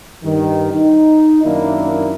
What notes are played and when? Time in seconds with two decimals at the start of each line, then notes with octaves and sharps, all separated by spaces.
0.24 G2 D#3
0.73 D#4
1.44 F#2 D#3 A#3 D4 E4